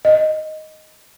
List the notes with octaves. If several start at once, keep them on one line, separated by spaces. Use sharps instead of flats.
D#5